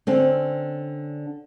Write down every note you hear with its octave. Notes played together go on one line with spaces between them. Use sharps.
D3 C4 C#4